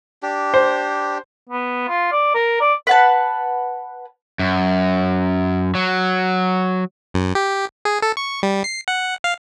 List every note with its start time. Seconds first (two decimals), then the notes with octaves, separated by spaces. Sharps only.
0.23 D4 G4
0.54 C5
1.49 B3
1.89 F4
2.12 D5
2.35 A#4
2.61 D5
2.87 B4 F#5 A5
4.39 F#2
5.75 F#3
7.14 F#2
7.35 G4
7.85 G#4
8.02 A4
8.17 C#6
8.43 G3
8.64 C7
8.88 F#5
9.24 F5